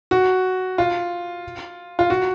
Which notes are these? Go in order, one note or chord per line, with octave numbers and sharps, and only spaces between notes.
F#4
F4
F4
F#4